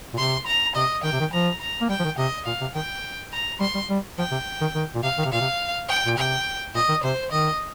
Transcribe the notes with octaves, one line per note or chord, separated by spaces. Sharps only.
A#2
C3 C6
A#5
C3 D#5
D#3 G5
C3
D#3
F3 A#5
A#5
A#3
G3 G5
F3
D#3
C3 D#5
A#2 F5
C3
D#3 G5
A#5
G3 C6
G3
G3
F3 G5
C3
D#3
D#3
A#2
C3 F5
D#3
C3
A#2 F5
C3
G5
A#2
C3 G5
A#2 D#5
D#3
C3 C5
D#3 D#5